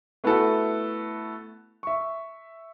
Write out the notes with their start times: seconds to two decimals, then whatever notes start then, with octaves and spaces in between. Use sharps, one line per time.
0.24 A3 B3 E4 F#4 A4 F#5
1.83 E5 C#6